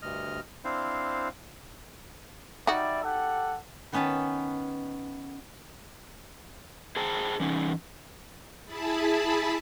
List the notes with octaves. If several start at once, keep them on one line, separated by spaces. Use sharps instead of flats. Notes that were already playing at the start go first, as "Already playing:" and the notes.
D2 G2 D#5 F6
C4 D4 E4 C5 F5
G3 D#4 F#4 D5 E5
G4 A4 F#5
D#3 B3 C#4 B4 A5
G#4 C5 G5 A5 A#5
E3 C#4 D#4
E4 G#4 A5 B5